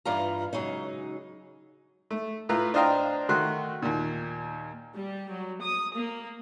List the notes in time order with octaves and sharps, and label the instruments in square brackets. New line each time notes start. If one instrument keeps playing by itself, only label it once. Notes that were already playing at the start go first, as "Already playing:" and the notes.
[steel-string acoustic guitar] G2 E3 G3 F4 F5 A#5
C#3 F#3 G#3 D#4
[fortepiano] A3
A2 A3 F4 B4 A#5
D4 C5 D#5 F5 G5 A#5
D#3 A3 F#4 C6 F#6
D#2 A#2
[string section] G3
F#3
D#6
A#3